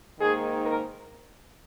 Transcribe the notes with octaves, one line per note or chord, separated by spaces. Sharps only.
G#2 D#3 A#3 D#4 G#4
A#4